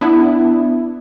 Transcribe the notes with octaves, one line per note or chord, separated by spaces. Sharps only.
B3 D4 E4